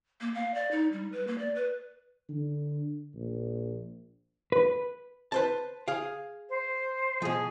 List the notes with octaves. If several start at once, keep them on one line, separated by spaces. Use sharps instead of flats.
A#3
F5
D5
D#4
G3
B4
A#3
D5
B4
D3
A#1
B4
B4 C5 A5
G#4 F5
C5
B2 F3 G#4